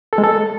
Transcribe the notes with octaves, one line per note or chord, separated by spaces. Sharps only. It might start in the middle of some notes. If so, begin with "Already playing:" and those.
A4
G#3
A4